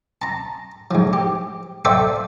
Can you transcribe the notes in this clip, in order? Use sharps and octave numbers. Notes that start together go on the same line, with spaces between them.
A5 A#5
G#2 F3
G4
A4 C5 D5 E5 F5 G5